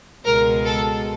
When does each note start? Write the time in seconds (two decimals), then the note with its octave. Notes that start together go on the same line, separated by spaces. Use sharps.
0.25 C#2 B2 G#3 A#4
0.65 A4